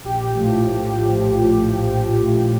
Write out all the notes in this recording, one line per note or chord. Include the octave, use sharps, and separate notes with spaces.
A#1 G4
A2 F3
A#1
A2 F3
A#1
A2 F3
A#1 G4
A2 F3